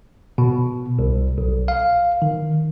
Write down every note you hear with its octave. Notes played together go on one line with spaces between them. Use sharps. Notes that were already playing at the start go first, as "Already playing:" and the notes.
B2
C2
B1
F5
D#3